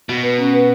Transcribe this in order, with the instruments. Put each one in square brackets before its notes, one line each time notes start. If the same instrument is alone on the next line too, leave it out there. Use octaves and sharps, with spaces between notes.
[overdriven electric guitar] B2 [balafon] F#4
[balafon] B4
C#4
B4